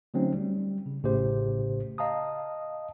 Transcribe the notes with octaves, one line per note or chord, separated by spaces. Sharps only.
D3 F#3 A3 C4 C#4 D#4
G3
C#3
A1 A2 C#3 A3 G4 C5
D#5 F5 A5 A#5 D#6